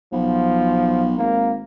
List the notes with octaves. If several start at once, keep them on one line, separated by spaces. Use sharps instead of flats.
B1 F3
G#1 A#3